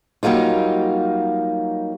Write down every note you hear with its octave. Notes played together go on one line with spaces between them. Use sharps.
F#3 G3 A#3 D#4 F4